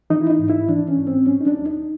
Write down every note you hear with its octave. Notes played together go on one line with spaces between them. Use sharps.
E3 D#4
E4
D#4
G#2
E4
E3 D4
C#4
G#2
C4
F#3 C#4
D#4
D4
D#2
D#4